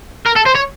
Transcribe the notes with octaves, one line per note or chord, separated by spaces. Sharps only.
A#4
A4
C5
C#5